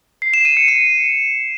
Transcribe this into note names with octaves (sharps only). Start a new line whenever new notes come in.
C7
E7
D#7
C#7
D#7